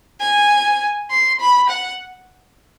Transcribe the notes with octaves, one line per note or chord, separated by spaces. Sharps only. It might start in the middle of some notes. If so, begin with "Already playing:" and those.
G#5
C6
B5
F#5